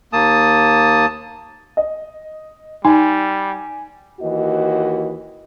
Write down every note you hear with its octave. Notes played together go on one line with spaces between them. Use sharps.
D#2 A#3 A5 D#6
D#5
G3 D#4 G#5
D#2 E3 F#4 D#5